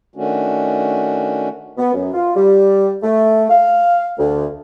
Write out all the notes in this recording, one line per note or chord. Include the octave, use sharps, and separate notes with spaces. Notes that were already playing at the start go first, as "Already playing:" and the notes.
D#3 A3 C#4 D4 F#4
B3
F#2
F4
G3
A3
F5
D2